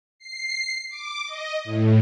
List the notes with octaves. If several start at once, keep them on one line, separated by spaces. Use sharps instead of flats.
C7
D6
D#5
A2